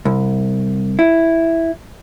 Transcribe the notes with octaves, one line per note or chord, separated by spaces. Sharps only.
C2
E4